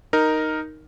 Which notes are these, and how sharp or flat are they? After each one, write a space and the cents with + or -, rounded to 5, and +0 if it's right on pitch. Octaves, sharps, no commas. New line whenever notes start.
D#4 +0 A#4 +0